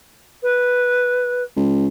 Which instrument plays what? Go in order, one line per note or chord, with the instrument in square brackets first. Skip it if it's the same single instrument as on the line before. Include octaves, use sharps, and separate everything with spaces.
[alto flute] B4
[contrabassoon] C#2